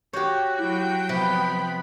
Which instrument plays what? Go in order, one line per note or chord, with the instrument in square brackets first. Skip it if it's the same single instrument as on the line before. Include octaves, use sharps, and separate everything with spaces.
[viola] F#4 [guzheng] G4 C#5 [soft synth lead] G6
[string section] F#3 G5 [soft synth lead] E4
[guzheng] C3 [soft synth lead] F3 [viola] B3 B5